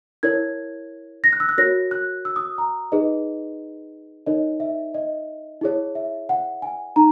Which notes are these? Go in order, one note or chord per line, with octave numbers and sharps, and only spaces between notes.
E4 A#4 C#5 G#6
A#6
F#6
E6
F#6
F#4 A#4 C#5 A#6
F#6
E6
D#6
A#5
D#4 G#4 B4 D#5
D#4 A#4 C#5 D#5
E5
D#5
E4 G#4 C#5
E5
F#5
G#5
D#4 A#5